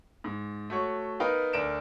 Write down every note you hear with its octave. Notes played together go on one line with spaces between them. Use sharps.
G#2
A3 F#4 C#5
B3 D#4 A#4 B4 F5 G5
D2 D4 A#4 D7 E7